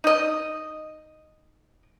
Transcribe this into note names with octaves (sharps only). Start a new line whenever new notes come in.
D#4 D#5